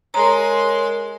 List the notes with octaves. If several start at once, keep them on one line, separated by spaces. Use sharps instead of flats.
G#3 A#4 C#5 A#5 C6